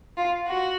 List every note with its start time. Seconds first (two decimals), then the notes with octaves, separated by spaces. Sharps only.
0.17 F4
0.47 F#4